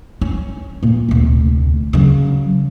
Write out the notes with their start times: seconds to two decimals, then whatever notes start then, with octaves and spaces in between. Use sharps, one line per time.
0.21 C#4
0.83 A#2 A#3
1.09 F1 D2
1.93 C#3 F#3